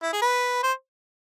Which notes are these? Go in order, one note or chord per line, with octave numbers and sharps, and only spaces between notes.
E4
G#4
B4
C5